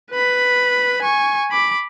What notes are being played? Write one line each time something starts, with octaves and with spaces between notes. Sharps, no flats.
B4 B5
G#5 C#6
B5 D6